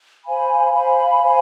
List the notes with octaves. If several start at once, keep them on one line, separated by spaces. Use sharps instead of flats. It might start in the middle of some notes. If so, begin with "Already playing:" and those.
C5 F5 G#5 B5
C5 F5 G#5 B5
C5 F5 G#5 B5